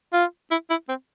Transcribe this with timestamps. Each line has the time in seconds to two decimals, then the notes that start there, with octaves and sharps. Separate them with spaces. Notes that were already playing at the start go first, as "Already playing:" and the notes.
0.13 F4
0.51 E4
0.70 E4
0.89 C4